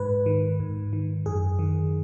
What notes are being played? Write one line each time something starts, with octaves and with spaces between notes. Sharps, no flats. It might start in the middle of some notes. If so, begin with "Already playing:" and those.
Already playing: G#2 B4
D#3
G#2
D#3
F#2 G#4
D#3